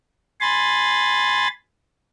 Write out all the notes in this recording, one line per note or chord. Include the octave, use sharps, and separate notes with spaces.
G#5 B5 C6 A6